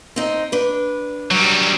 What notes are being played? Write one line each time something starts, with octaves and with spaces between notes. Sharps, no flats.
C4 D#4
D4 B4
F#3 G3